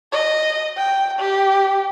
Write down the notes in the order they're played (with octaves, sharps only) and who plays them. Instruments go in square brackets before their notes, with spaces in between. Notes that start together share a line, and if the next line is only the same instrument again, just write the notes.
[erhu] D#5
G5
G4